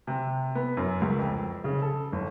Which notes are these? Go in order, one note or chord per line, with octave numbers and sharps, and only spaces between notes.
C3
B3
F#2
C#2
F2
C#3
A4
G1